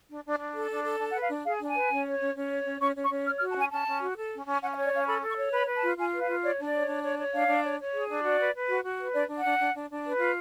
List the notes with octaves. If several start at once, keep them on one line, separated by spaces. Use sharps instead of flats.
D4
D4
D4
A4
D4
A4
D4 A5
F#5
B4
F5
D4
G#4 F5
D4 A5
G#5
B4
C#4
C#5
C#4
C#4
C#5
C#4
C#4 C#6
C#4
C#6
C#4
C#5 F6
F6
F#4
A5
C#4 G#5
C#4 A5
C#4
F#4
A4
C#4
C#4
C#4 F#5
F5
C#5
D5
C#4 F5
A4 B5
A4
C#6
C#5
B4 B5
B4
A5
F4
F4 G#5
B4
F5
F4
C#5 D5
D4
D5
C#5
D4
C#5
C#5
D4 F5
D4
C#5
C#5
G#4
D4
F#4 D5
B4
B4
F#4
F#4
B4
D4 D5
D4
F#5
D4
D4
D4
D4
B4
F4